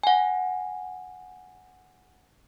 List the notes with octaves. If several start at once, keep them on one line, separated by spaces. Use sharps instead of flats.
F#5 G#5